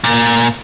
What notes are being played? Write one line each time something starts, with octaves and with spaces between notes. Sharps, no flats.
A#2